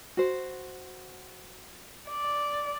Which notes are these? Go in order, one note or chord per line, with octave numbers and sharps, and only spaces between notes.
F#4 C5
D5